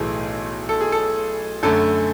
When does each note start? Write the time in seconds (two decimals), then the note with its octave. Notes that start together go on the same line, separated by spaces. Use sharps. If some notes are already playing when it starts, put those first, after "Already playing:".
Already playing: B1 A2 E3 A3 G#4
0.69 A4
0.81 G#4
0.92 A4
1.63 F#2 D3 A3 A4